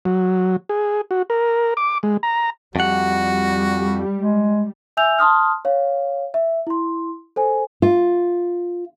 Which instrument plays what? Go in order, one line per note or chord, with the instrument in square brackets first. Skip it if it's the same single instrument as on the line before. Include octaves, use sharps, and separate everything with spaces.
[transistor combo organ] F#3
G#4
F#4
A#4
D6
G#3
A#5
[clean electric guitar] F2 F#5 [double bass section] G3 [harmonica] F#4
[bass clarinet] G#3
[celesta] E5 G#5 E6 G6 F7
A5 C6 D#6 F6
C#5 F5
E5
E4 C6
A4 C5 G#5
[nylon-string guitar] F4